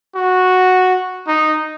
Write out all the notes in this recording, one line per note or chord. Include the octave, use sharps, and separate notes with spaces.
F#4
D#4